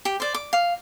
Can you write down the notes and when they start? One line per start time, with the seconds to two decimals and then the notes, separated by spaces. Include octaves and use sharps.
0.05 G4
0.20 C5 D5
0.34 D6
0.53 F5